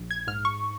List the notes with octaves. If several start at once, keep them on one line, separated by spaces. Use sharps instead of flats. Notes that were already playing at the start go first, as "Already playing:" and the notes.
Already playing: A#1
G#6
G#2 F6
C#6